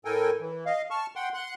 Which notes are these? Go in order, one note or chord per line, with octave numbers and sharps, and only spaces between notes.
A2 A4 A#4 G5 G#5
E3
D#5 F5
A5 C#6 F6
F#5 G5 C6
F#5 C6 F#6